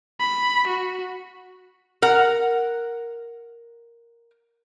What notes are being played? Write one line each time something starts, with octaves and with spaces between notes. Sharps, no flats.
B5
F#4
A#4 F#5